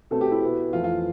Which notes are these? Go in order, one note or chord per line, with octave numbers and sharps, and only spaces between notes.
B2 A3 C4 A4
G4
E4
B2 B3
F2 E3 A3 F4
F4